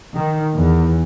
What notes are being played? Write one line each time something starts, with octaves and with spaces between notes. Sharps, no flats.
D#3
E2